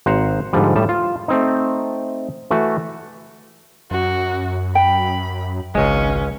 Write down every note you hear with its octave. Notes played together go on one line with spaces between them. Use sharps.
G#1 C5 F#5 A#5
G#2 D3 F3 G3
A2 G3 A5
F4
A3 C4 D#4
E3 A3 F#4
F#2 F#4
G5 B5
G#1 C#2 G#3 C#4